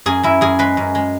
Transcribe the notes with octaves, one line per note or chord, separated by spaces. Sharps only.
F#2 G#4
F#2 E4
F#2 G#4
G#3 B4
F#2
G#3